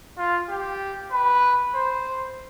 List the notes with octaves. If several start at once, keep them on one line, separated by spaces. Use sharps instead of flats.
F4
G4
B4
C5